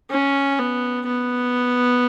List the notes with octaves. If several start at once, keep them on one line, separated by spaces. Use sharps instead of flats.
C#4
B3
B3